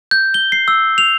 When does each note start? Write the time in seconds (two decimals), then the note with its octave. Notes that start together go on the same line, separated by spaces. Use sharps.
0.11 G6
0.34 G7
0.52 C7
0.68 E6
0.98 F7